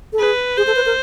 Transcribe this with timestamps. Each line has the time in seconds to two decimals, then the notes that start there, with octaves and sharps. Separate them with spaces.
0.13 A4
0.19 G#4 B4
0.57 G#4 C5
0.67 A4
0.76 B4
0.86 A#4